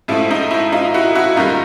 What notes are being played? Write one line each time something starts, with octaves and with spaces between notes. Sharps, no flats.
G#2 F3 A3 E4
D#4
E4
D#4 F4
E4 F#4
E4 F#4
F#2 D#3 G3 D#4 F4